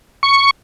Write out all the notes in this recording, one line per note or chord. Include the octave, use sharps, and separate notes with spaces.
C#6